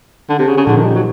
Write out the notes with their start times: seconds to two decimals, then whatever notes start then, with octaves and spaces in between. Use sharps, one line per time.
0.29 D3
0.39 C3
0.47 C#3
0.57 C#3
0.67 A#2 D3 F3 A#3 D#4
0.77 D#3
0.85 G3
0.95 F#3